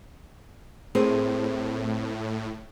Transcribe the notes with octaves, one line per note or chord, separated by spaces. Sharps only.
A2 C4 G#4 A#4